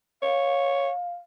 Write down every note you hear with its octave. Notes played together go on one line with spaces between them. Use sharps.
C#5 F5